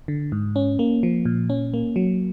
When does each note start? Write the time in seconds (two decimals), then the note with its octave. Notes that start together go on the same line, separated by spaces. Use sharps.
0.08 D3
0.32 G#2
0.56 C#4
0.79 A#3
1.03 F3
1.25 A#2
1.50 C#4
1.74 A#3
1.96 F#3